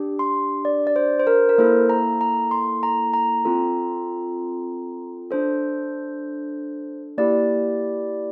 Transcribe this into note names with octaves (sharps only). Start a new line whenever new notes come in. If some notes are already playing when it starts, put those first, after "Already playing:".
Already playing: D4 G4
C6
D5
D5
C5
C5
A#4
A#4
A#3 E4 A4 C5
A#5
A#5
C6
A#5
A#5
C4 F4 A4
D4 A4 C5
A#3 E4 G4 D5